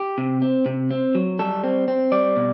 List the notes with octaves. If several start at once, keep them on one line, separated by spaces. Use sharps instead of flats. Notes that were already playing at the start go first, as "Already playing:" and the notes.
Already playing: G4
C3
C4
C3
C4
F#3
G3 A4
C4
C4
G3 D5
B2